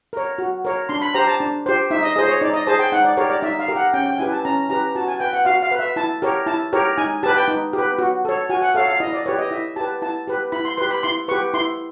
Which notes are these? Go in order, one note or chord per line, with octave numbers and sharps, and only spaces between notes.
A#4 C#5
F#4
A#4 C#5
D4 C6
B5
G4 C5 A#5
A5
D4
G4 C5
D#4 E5
D#5
G#4 C5 D#5
C#5
D#4 D5
D#5
G#4 C5 A5
G5
D#4 F#5
D5
G4 A#4 C#5
D5
D#4 E5
F5
G4 A#4
F#5
C#4 G5
G5
E4 G4 B4 G#5
A5
C#4 A#5
E4 G4 B4 A#5
F#4 A5
G#5
B4 G5
F#5
F#4 F5
F5
B4
E5
E4 A5
G4 A#4 C#5
E4 A5
G4 A#4 C#5
D#4 G#5
G4 B4 A5
G5
D#4
G4
B4
F#4
A4 C#5
F#4 G#5
F#5
A4 C#5 F5
F5
E4 D#5
D5
G4 B4 C#5
D#5
E4 E5
G4 B4 A5
E4 A5
G4 B4
E4 B5
C6
G4 B4 C6
B5
E4 C6
G4 B4 C#6
E4 C6